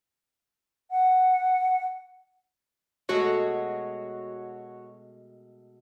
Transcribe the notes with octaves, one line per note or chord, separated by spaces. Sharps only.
F#5
B2 G#3 A3 F#4 C#5